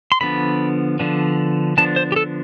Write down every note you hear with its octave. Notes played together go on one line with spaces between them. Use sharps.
C6
D3 F3 B3 D4 B5
D3 F3 B3 D4
D3 F3 B3 D4 A5
C5
G4
A4